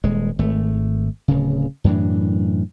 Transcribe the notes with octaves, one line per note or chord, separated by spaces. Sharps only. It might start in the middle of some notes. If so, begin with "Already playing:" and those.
D#1 G#3
G#1 A3
D1 C#3
F#2 A2 E3 D4